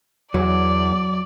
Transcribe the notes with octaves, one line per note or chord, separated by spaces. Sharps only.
E2 F#3 D5